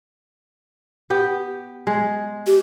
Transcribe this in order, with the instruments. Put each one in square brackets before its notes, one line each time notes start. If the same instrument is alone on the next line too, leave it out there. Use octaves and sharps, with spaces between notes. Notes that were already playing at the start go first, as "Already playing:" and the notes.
[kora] B3 G4
G#3
[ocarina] G4